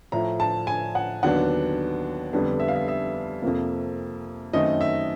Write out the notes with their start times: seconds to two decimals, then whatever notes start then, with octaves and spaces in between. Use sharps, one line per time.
0.12 A2 F3 A3 A#5
0.40 A5
0.67 G#5
0.95 F#5
1.23 D#2 D3 F#3 B3 D4 F#5
2.33 F2 D3 G3 B3 D4
2.60 E5
2.68 F5
2.76 E5
2.88 E5
3.42 F2 C3 F3 A#3
4.53 F#2 D#3 F#3 A3 C4 D#5
4.81 E5